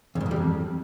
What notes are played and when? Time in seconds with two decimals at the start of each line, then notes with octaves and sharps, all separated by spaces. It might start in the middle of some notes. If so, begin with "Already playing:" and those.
0.15 E2
0.21 G2
0.26 E2
0.31 G3
0.36 F2